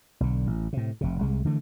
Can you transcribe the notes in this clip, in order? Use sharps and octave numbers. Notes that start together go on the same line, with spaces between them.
B1 D3
A1
A2 C3
F1 C3
C2 G#3
D3 E3 A3